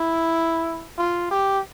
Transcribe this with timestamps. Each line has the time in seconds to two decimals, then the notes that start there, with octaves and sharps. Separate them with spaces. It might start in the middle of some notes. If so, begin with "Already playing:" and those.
Already playing: E4
0.98 F4
1.31 G4